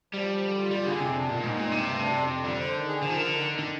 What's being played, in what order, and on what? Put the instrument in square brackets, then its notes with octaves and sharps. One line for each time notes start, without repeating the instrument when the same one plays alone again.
[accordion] F3 [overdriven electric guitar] G3
[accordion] F3
D3
F4
[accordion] A#2 [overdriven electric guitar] G3
[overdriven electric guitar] D3 [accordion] G#4
[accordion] F2 [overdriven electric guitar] C3
[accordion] D4
[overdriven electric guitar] A#2 [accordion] D#3
[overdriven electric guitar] G#2 [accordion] D#4
[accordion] G2 [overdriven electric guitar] A#2
[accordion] G2 [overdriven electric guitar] C3
[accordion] D2
D4
F2
F2
[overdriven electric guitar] D3 [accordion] G3
[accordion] C5
D#3
G#4
[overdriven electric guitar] D3 [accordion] F3
[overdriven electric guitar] D#3
[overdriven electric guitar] D3 [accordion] A#4
[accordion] D#3
D#3
[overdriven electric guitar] D3